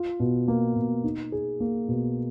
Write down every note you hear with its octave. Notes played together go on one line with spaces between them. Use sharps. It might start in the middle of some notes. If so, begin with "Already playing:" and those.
Already playing: F4
B2
A#3
B2
D#4
G#4
A#3
B2